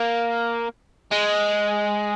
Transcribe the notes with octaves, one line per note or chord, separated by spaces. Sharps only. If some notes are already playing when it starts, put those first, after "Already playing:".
Already playing: A#3
G#3